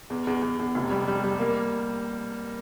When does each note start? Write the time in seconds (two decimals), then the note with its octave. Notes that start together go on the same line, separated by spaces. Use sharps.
0.10 E2
0.27 E2
0.42 E2
0.59 E2
0.75 F1
0.91 G3
1.08 G3
1.24 G3
1.40 A#3